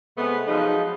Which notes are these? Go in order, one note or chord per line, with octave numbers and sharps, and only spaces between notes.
C3 G#3 A3 B3
F3 F#3 G#3 D#4 B4